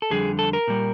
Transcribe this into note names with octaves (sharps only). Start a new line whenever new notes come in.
A4
F2 D3 G3 G#4
A4
A#4
A#2 G3